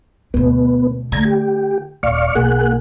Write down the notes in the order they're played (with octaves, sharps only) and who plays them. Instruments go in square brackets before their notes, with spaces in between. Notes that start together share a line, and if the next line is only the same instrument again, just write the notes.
[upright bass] D2 B2 [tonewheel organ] B3
[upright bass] D3 A3 [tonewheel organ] A#5 G#6
[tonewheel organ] G4
[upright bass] D#1 [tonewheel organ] D5 F5 C#6
[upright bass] B1 [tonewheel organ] A#3 G#4 F#5